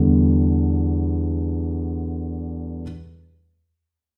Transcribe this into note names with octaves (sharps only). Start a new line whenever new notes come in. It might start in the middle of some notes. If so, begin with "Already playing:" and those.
Already playing: E2 D3 G3 B3